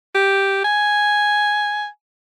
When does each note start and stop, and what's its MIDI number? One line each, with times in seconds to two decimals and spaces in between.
0.15 0.64 67
0.64 1.86 80